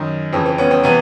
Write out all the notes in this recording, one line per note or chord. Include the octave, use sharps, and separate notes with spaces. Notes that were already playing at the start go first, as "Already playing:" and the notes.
Already playing: F#2 D#3
F2 C#3 E3 C4
C4
B3 C#4
C4
C3 E3 B3